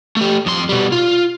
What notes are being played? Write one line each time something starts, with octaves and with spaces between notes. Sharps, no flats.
A3 G4
F2 C6
B2 G3
F4